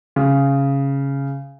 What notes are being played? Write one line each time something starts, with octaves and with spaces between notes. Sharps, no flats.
C#3